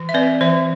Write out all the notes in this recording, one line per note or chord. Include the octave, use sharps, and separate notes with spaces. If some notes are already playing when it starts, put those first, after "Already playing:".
Already playing: E3
E5
C4 B4 D5
E3 C5 E5